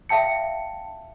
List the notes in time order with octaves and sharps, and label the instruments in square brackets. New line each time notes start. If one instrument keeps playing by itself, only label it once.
[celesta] E5 F5 G5 A5 C#7